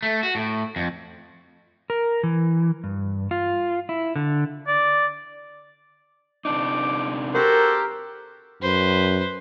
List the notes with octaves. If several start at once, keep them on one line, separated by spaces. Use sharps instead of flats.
A3
F#4
A2
F2
A#4
E3
G2
F4
E4
D3
D5
C3 D4 D#4 D6
F#4 G4 A4 A#4 C5
F#2 B4 C5